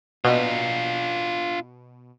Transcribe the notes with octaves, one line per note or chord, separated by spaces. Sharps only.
B2 D4 F4